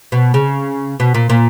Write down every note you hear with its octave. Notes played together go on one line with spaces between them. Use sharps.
B2
C#3
B2
A#2
A#2